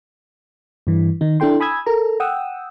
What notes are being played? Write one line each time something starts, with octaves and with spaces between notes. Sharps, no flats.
G2 E3
D#3 D#4
D4 E4 A4 G5 C6
G#5 B5 D#6 E6 G#6
A4 A#4 A#5
F#5 G5 D#6 E6